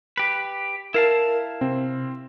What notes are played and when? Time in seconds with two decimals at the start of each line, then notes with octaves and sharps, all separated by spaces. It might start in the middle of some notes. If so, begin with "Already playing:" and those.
0.17 G4 B4
0.94 E4 A#4 F5 A5
1.61 C3 C4